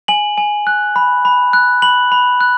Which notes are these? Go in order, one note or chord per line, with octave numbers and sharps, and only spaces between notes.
G#5 F#7
G#5
F#6
B5
B5
F#6
B5 F#7
B5
F#6